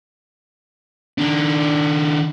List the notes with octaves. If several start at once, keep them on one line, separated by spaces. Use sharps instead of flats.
D#3 D4